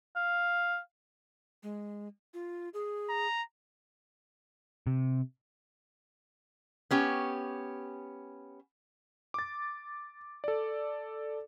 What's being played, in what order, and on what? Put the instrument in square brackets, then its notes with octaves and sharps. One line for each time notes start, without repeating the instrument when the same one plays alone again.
[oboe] F5
[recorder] G#3
F4
G#4
[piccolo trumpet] A#5
[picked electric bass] C3
[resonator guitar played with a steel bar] B3 C#4 G4
[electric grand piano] D6 A6
A4 D5